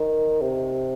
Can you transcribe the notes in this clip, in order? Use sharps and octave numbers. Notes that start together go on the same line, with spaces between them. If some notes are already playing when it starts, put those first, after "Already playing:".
Already playing: D#3
C3